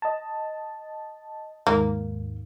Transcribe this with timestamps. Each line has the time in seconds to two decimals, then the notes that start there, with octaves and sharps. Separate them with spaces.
0.02 D#5 A5
1.67 D#2 G#2 A#3